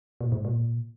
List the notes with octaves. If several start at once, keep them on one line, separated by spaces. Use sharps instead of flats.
A#2
G#2
A#2